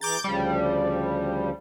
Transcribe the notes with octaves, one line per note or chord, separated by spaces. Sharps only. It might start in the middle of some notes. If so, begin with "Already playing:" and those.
E3 G#4 A#5 D6 G6 A6
D2 C#3 F3 G3